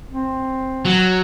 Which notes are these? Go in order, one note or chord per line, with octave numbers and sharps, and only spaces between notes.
C4
F#3